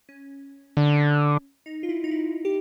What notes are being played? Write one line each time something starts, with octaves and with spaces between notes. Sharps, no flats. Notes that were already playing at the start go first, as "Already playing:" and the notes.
C#4
D3
D#4
F4
E4
D#4
E4
G4